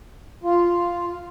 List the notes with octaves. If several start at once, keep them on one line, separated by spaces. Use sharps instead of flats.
F4